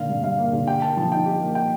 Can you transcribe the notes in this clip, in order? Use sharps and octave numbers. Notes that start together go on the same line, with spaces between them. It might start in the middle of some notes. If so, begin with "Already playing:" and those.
Already playing: D3 A#3 F5
G2
G3 F5
A#3
D3
G4 G5
A#3 A5
F3 A5
D#4 G5
G4
A#3
G5